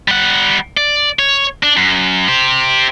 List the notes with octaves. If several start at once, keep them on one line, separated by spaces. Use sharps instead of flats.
G3 F#5
D5
C#5
D4
F#2
G4 C5